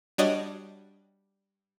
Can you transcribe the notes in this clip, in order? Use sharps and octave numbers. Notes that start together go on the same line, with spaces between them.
G3 D4 F#4 C#5 D#5